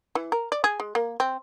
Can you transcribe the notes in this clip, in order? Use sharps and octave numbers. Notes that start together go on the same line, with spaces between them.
E3
A#4
D5
G#4
G#3
A#3
C4